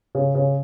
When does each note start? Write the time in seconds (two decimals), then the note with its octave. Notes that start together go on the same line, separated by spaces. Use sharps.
0.15 C#3
0.35 C#3